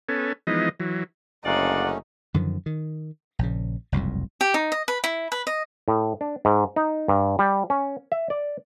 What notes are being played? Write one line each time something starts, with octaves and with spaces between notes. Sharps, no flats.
B3 C#4 A4 G#5
E3 F3 G#3 B3 D#4 D#5
E3 F#3
F#1 D3 A3 C#4 D#4 D5 F5 F#5
F#2 D3 D#3 F3
D#3
A#1 C#3
F#1 C2 F2 G#2
G4
D#4
D#5
B4
E4
B4
D#5
A2
D4
G#2
D#4
G2
G3
C#4
E5
D5